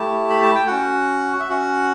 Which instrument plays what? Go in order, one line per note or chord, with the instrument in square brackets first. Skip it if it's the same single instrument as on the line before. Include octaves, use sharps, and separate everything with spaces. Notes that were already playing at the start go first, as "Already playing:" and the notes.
Already playing: [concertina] A3 E4 G4 A5
B5
A5
G5
C#4 F#4 F#5
E5
C#4 F#4 F#5